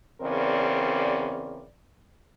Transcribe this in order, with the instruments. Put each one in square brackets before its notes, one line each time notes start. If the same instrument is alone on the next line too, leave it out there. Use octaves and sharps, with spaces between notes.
[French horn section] E2 C#3 C4 A#4 D5